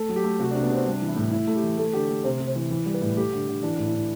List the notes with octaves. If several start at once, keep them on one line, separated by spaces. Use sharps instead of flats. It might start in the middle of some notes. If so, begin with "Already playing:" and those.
Already playing: A3 A4
F#3
G4
A3
C3 F#4
D4
C3
B3
C3 C4
G3 D4
E3
E4
A2
A2 E4
A3
G4
E3
A3 A4
D3 G4
A3 A4
C3 C5
C3
C5
E3
E3
G3
B4
A2
A3 G4
D3
D3
E3 D4
A2
E4
A2